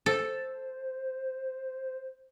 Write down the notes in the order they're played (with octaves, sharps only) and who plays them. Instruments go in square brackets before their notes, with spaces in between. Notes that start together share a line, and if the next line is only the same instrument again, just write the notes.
[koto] A4 [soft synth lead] C5